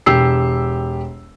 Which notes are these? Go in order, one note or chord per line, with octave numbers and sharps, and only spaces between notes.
E1 G4 E6 C7